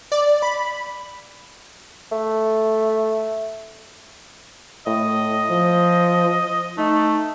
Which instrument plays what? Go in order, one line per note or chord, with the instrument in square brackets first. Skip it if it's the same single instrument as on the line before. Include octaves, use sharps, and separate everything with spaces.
[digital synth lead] D5
B5
[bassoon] A3
[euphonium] A2 [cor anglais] D#5
[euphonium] F3
[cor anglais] A3 [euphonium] D#4